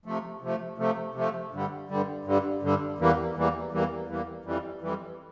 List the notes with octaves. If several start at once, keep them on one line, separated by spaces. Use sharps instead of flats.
C3 F3 A3
C3 F3 A3
C3 F3 A3
C3 F3 A3
G2 D3 G3
G2 D3 G3
G2 D3 G3
G2 D3 G3
E2 E3 G3 A#3
E2 E3 G3 A#3
E2 E3 G3 A#3
E2 E3 G3 A#3
F2 E3 G3
F2 E3 G3